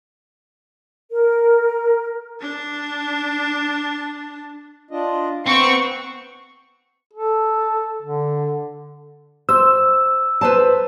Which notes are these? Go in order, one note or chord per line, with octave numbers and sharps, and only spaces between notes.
A#4
D4 A5
D4 F4 D#5
B3 C4 B4 C#6
A4
D3
C5 E6
B4 C5 A5